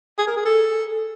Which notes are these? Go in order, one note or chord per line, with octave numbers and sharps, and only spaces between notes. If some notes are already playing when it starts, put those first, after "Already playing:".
G#4
A#4
G#4
A4